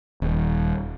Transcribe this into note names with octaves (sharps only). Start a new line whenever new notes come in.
D#1